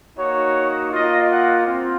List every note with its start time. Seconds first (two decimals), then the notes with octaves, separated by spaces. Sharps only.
0.17 A#3 D#4 F#4 C#5
0.92 A#3 F4 D#5
1.30 F#5
1.67 C4 F4